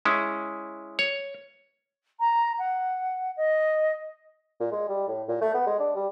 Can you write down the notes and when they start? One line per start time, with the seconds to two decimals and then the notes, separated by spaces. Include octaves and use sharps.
0.05 G#3 C#4 E4
0.99 C#5
2.20 A#5
2.59 F#5
3.37 D#5
4.60 A#2
4.72 G#3
4.89 G3
5.07 A2
5.28 A#2
5.41 A3
5.54 B3
5.67 G#3
5.79 D4
5.95 G3